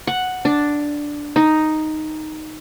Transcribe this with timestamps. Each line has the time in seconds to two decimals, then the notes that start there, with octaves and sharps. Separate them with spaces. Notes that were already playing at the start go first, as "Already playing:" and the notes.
0.07 F#5
0.45 D4
1.36 D#4